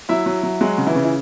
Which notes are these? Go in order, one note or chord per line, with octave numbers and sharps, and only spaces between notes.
F#3 E4 E5
F#3
F#3
F#3 G#3 F#4
C#3
E3 E4
C#3
E4